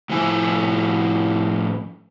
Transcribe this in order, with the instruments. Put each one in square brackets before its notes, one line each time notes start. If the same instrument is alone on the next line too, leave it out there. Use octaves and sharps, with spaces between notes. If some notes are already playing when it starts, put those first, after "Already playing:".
[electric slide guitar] A2 F3 E4 G#5